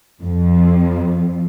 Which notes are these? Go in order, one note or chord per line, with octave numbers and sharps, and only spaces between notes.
F2